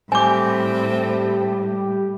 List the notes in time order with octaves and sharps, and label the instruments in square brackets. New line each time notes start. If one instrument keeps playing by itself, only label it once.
[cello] A2 [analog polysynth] G3 G4 [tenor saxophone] C4 [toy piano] G#5 D6